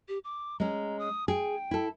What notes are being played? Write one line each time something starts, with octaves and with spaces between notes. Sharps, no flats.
G4
D6
G#3 C#4 A#5
D#6
G#4 G5
E4 A4